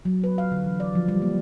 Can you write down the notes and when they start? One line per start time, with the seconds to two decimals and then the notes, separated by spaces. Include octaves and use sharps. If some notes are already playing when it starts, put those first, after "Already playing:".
0.05 F#3
0.24 B4
0.38 F5
0.52 D3
0.64 E3
0.80 D5
0.95 F3
1.08 G3
1.22 A#3